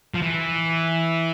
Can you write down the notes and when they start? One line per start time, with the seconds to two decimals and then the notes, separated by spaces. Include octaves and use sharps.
0.14 F3
0.22 E3